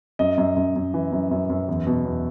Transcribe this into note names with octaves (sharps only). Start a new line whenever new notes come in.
F#2 D#5
F#2
F#2
F#2
E3
F#2
F#2
F#2
E2
B2
E2